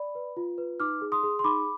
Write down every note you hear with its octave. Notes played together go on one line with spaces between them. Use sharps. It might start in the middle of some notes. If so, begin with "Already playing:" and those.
Already playing: D5 B5
B4
F4
B4
D#4 D6 F6
G#4
C6 D#6
G#4
C6
D#4 B5 D6